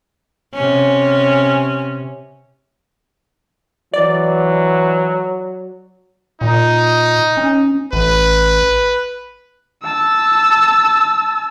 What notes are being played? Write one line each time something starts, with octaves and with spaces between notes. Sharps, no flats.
C3 C#4
E3 F#3 D5
A#2 D#4
C#4
A1 B4
A5 E6